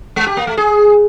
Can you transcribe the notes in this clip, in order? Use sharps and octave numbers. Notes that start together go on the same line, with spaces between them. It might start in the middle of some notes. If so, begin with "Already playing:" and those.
G#3
G4
A#3
A3
G#4